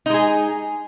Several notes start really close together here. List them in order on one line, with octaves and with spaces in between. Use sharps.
D#4 G#3 G#4